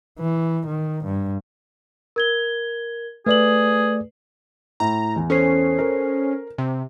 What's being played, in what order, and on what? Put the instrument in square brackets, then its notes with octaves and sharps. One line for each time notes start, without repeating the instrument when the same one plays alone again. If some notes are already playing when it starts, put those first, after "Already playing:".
[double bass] E3
D#3
G2
[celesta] A#4 G#6 G7
[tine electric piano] A3 D5 [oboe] G#4 [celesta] B4 F#7
[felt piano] A2 [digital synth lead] A#5
[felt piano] E2
[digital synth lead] C#4 [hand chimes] A4 C5 C7
[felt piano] A#4
[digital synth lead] C3